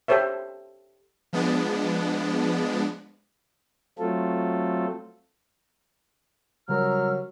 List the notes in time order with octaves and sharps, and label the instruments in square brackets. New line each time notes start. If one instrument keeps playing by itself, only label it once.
[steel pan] G4 A4 C5 C#5 E5
[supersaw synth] F3 G#3 B3 D4
[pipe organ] F#3 A3 C4 F4 A4
[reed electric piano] C#3 G3 A#4 [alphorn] F#3 [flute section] A#5 E6 F6